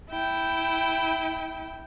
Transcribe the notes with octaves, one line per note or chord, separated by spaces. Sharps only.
E4 G5